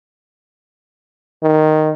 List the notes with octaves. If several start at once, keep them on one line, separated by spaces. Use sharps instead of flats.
D#3